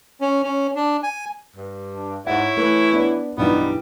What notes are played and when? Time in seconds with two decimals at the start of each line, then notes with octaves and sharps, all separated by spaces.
0.21 C#4
0.43 C#4
0.76 D4
1.03 G#5
1.56 G2
1.94 D4
2.27 G#2 E4 C#5 F#5
2.57 E3 A3
2.93 B3 D4
3.37 B1 G2 E3 G3 B3 D#4